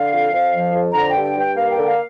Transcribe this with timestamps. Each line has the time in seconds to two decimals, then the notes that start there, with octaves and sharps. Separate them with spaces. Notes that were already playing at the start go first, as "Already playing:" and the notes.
Already playing: D3 F5
0.11 F2
0.32 F2
0.54 F3
0.73 F2
0.94 D3 A#5
1.10 G5
1.15 G2
1.24 G5
1.35 G2 G5
1.56 A#3 F5
1.72 G5
1.77 D3
1.87 F5